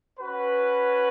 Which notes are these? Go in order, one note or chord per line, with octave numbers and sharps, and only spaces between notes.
C#4 F#4 B4